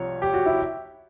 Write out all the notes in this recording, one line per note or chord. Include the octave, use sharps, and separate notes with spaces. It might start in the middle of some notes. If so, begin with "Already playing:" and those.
Already playing: C2 F3 C#5
G4
F#4
E4